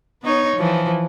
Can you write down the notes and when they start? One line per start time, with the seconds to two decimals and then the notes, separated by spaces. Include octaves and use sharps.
0.23 B3 D#4 C#5
0.55 E3 F3